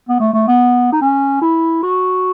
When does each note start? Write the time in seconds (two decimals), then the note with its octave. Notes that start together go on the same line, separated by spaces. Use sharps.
0.09 B3
0.20 A3
0.33 A3
0.48 B3
0.93 D#4
1.01 C#4
1.42 E4
1.82 F#4